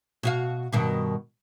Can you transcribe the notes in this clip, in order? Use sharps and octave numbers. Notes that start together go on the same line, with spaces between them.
B2 F#4 F5
G2 B2 D#3